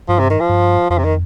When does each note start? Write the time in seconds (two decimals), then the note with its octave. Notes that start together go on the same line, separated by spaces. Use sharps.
0.09 G2 F3
0.19 C3
0.30 D#3
0.40 F3
0.49 G2
0.90 F2 F3
0.98 C3
1.04 D#3